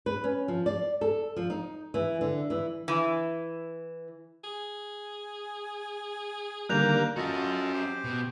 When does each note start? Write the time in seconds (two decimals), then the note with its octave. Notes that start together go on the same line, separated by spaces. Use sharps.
0.06 B4
0.24 C#4
0.48 F3
0.66 D5
1.01 A4
1.36 F3
1.50 D#4
1.94 E3
2.21 D3
2.50 E3
2.88 E3
4.44 G#4
6.69 E2 D3 D#3 G3 A#3 F#6 G6 F7
7.16 C#4 F4 F#4 A4 D#5
7.73 G4 C5 G5
8.04 B2